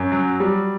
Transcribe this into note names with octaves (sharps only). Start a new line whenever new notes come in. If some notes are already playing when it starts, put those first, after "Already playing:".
Already playing: F#2
F#3
G3